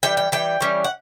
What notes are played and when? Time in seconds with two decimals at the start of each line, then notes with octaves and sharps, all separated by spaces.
0.03 E3 G3 G5
0.17 G5
0.32 E3 G3 G5
0.60 E3 G3 C#4
0.84 F#5